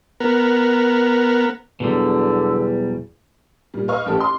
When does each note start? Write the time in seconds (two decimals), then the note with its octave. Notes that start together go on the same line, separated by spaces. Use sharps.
0.20 B3 A#4
1.80 E2 B2 D3 F#3 G3
3.74 A#2 G3
3.88 B4 D#5 F5 C#6 F6
4.06 A1 G4 A4
4.20 C6 D6